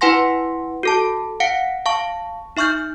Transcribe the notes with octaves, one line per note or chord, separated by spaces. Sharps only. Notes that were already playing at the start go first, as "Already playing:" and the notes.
E4 B4 F#5 G#5 C6 A#6
F#4 A4 A5
F5 F#5 C#7 D7
F5 A5 C#6
D#4 E5 C#6 F6 G6